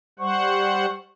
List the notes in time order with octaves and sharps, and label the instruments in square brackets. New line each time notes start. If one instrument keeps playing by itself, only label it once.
[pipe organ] G3 C5 F#5 [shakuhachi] C#6